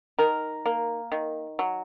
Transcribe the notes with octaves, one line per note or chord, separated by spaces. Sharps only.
D#3 A#4
A#3
D#3
F#3